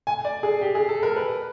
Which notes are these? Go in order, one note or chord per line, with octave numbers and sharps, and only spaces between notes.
G#5
D5
G#4
G4
G#4
A4
A#4
B4